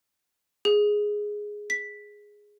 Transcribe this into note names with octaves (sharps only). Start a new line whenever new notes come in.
G#4
B6